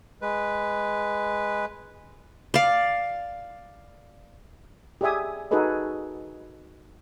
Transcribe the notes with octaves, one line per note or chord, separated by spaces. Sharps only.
G#3 B4
D5 F5
G4 G#4 D5 E5 G#5 D#6
D#4 F#4 G#4 A4 B4 D#5